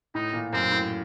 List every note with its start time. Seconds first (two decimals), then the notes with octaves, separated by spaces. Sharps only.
0.15 A2 D#4
0.33 A#2
0.53 F#2 C4
0.72 A2